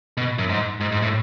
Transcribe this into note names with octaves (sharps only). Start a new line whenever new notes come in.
B2
F#2
G#2
G#2
G#2
A2